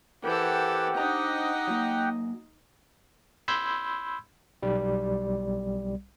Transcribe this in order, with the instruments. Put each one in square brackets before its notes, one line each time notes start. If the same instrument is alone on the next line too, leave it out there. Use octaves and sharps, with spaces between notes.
[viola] E3 A4 [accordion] G4 F#5 G5 [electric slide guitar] A#4 C5
[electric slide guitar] D4 C5 A#5 [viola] D#4 D#5
[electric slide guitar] F#3 A#3
[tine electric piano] B5 C6 E6 G6 G#6
B1 G3